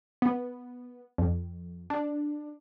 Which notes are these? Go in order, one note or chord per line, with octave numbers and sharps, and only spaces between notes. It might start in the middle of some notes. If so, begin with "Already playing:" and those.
B3
F2
D4